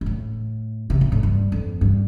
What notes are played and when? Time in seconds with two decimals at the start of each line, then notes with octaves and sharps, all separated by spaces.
0.01 G2
0.06 A2
0.90 C3
1.01 A#2
1.12 A2
1.23 G2
1.52 F2
1.81 G2